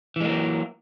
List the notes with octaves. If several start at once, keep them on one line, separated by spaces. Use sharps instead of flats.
E3 F#3 G#3 A#3